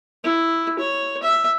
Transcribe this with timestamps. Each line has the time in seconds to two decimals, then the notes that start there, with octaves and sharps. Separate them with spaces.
0.24 E4
0.79 C#5
1.23 E5